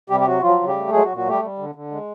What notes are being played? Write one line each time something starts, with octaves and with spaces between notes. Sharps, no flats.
C3 G3 G4
G4
F#3 F#4
F3 F#3 F4
C#3
G3 G4
A3
F#3 G#3 G#4
F#3 F#4
A#2
F#3 F#4
G3 A3 G4
G3
D3
D3
G#3